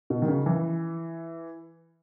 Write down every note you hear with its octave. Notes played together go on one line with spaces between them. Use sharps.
B2
D#3
C#3
E3